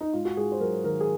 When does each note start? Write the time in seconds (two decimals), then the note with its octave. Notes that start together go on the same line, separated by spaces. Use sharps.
0.01 D#4
0.13 G#2 F4
0.25 F#4
0.37 G#2 G#4
0.52 C5
0.60 F#3 A#4
0.84 D#3 A#4
1.00 G#4